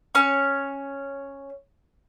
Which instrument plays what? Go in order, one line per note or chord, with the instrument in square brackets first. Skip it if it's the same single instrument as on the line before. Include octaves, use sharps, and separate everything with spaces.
[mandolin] C#4 C#5 C#6